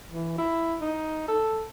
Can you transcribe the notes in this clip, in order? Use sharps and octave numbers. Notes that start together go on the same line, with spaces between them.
E3
E4
D#4
A4